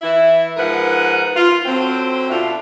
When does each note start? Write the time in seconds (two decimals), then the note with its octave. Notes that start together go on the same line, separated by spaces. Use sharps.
0.02 E3 E4
0.57 G#2 F3 A#4 B4 F#5
1.36 F4
1.66 D3 F#3 C4
2.30 B2 D4 E4 F4 A4